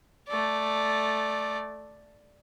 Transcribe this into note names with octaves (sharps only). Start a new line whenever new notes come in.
A3 D5